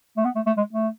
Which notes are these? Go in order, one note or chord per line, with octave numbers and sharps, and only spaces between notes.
A3
B3
A3
A3
G#3
A3